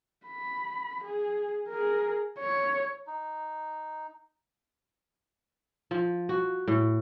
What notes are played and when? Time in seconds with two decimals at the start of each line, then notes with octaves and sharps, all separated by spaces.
0.26 B5
1.04 G#4
1.69 G#4 A#4
2.39 C#5
3.07 D#4
5.91 F3
6.29 F#4
6.68 A2